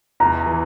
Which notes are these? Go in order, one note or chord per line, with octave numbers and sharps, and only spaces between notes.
E2 A#5
E3